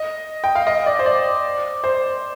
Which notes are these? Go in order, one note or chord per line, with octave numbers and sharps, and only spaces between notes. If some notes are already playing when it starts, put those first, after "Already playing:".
Already playing: D#5
G5
F5
D#5
D5
C5
D5
C5